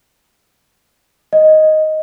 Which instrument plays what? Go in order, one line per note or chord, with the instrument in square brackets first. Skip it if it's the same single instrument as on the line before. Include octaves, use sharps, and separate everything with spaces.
[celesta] D#5